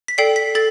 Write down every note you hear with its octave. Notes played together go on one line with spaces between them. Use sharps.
B6
A4 D5 G5 C7
B6
A4 A6